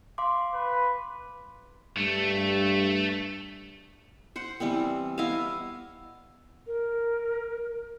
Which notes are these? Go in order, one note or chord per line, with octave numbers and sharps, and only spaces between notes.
F5 C6 D6
B4
G2 A3
C5 F#5
E3 G3 B3 C4
B3 E4 D#5 F5
A#4